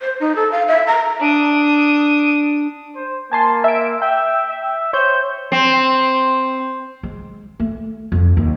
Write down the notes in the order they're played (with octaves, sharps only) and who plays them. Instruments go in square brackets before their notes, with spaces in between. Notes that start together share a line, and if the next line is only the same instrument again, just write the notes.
[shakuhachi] C5
D#4
A4
F5
E5
A#5
[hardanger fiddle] D4 D#6
[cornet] C5
[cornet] A#3 [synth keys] G#5 A5 C6
[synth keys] E5 D7
[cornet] E5 [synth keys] G5
[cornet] E5
[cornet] C5 [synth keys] C#5 G6
[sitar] C4
[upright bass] G#3
A3
F2
D#2